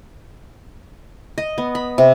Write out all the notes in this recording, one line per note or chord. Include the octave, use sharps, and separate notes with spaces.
D#5
B3
B5
C3